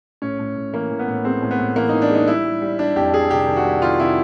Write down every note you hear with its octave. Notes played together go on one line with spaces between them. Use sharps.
A2 C#4
A2
A2
E3 A#3
E3
B3
A2
G#3 C4
A2
B3
A2
E3 A#3
E3 D#4
D4
G#3 D#4
G3 E4
G3
G3
G3 D4
F2 G4
G3 G#4
C3 G4
D#3
F#4
G3
D#3 F4
C3 E4